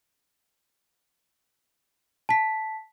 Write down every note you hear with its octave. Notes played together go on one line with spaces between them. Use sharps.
A5 B6